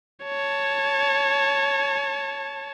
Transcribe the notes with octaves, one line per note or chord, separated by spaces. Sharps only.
C#5 A5